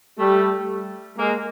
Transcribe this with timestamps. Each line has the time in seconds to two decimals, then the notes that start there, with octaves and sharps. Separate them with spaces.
0.18 G3 A3
1.18 G#3 A#3